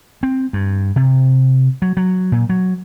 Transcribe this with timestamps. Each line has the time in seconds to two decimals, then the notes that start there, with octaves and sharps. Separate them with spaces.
0.23 C4
0.53 G2
0.96 C3
1.82 F#3
1.97 F#3
2.32 A#2
2.49 F#3